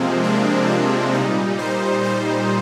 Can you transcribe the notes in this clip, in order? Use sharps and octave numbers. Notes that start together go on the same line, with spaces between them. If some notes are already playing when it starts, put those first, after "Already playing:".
Already playing: C3 F3 G#3 A#3 C4
D4
D4
A#2 G3 D#4
C5
C5